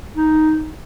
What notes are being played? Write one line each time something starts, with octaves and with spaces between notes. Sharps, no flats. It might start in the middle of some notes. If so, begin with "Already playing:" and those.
D#4